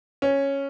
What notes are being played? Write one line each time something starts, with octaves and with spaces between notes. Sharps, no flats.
C#4